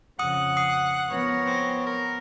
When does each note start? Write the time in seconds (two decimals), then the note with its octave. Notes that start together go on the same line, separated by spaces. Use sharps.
0.19 F2 C#3 F#5 D#6
0.57 D#6 C7
1.10 F3 B3 A#4 C#5
1.47 C4
1.86 A#4